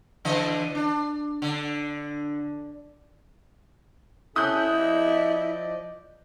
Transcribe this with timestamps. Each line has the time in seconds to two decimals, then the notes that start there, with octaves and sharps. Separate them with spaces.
0.25 D3 E3 D#5
0.75 D4
1.42 D3
4.36 C#4 E4 A4 D#6 F#6 G6
4.69 F3 D5 D#5